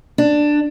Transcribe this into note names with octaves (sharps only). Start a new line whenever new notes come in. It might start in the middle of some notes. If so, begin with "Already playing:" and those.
D4